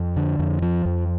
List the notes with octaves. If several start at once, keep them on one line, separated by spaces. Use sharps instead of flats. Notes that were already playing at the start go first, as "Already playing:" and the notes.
Already playing: F2
D3
F2
F3
F2